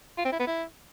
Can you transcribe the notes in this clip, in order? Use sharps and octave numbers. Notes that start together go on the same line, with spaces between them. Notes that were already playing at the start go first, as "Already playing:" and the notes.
F4
C4
E4
B3
E4